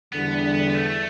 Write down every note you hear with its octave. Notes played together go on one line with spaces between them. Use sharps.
E2 D3 G3 B3
B3
B3
A3